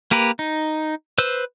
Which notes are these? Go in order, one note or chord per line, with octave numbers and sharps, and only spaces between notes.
A#3 G4 A#4 B4
D#4
B4 C5 E6